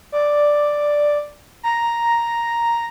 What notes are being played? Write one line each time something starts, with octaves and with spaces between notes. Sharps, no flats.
D5
A#5